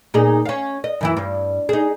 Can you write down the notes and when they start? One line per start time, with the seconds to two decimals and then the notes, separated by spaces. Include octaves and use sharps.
0.14 A#2 D#4 G#4
0.45 C#4 F5
0.84 D#5
1.01 F#2 E3 E4
1.17 G2
1.69 D#4 G#4